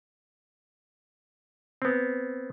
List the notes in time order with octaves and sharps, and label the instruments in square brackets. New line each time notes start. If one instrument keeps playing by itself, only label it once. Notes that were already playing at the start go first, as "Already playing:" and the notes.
[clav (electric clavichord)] B3 C4